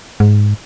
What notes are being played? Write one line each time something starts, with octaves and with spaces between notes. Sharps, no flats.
G#2